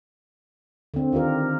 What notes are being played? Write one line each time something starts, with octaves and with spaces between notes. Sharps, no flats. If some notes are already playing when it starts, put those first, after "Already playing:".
D3 C4
D#3 F4 G4 A#4